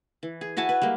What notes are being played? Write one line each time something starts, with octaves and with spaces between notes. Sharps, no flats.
E3
G#4
E4 F#4 G#5 A5
B4
G3 G#3 A#3